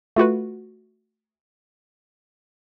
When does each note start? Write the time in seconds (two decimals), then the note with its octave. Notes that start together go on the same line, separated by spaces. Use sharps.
0.16 A3 F4 F#4 B4